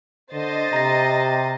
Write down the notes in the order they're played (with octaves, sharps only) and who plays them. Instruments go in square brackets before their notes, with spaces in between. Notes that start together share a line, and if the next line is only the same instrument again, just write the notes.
[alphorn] D3 [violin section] C5 D#5 A6
[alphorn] C3 [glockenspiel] A#5 A#6